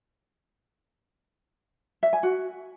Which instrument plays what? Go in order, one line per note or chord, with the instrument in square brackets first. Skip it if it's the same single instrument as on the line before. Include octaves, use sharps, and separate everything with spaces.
[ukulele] E5
G#5
F#4